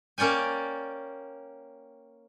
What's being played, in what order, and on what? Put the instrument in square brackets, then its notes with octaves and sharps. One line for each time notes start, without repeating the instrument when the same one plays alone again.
[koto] A#3 C#4 D5 G5 G#5